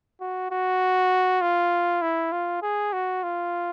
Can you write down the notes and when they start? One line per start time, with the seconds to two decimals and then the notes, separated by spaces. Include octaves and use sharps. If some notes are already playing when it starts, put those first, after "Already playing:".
0.21 F#4
0.51 F#4
1.42 F4
2.02 E4
2.32 F4
2.62 G#4
2.93 F#4
3.23 F4